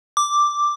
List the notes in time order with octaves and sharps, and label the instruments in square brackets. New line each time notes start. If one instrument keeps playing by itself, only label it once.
[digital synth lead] D6